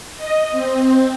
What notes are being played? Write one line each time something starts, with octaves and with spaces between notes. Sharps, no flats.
D#5
C4